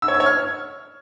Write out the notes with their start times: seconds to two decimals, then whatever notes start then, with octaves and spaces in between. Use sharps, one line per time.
0.02 E6
0.08 C#5
0.14 E6
0.20 C#5
0.26 F6